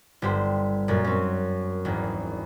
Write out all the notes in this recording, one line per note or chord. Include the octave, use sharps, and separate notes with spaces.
G1 G2 G4 C5
F#2 A#2
C4 C#4
G#1 E2